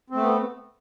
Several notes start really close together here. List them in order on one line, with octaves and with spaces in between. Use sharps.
C4 A3 B3